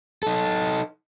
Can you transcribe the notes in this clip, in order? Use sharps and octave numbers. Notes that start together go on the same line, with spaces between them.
D#4 A4